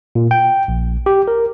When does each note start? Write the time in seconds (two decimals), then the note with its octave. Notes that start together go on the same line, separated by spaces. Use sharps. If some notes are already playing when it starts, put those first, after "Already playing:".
0.15 A#2
0.31 G5
0.68 A#1
1.06 G4
1.28 A#4